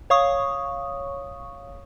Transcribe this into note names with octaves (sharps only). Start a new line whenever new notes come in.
C#5 F5 C#6 D#6